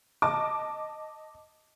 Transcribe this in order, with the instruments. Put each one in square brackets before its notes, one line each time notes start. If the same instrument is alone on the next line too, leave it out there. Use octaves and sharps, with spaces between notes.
[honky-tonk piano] D#5 A5 D6